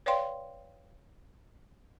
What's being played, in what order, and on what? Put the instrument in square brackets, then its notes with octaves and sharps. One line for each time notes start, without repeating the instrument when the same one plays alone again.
[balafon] B4 C#5 D5 F5 G5 C6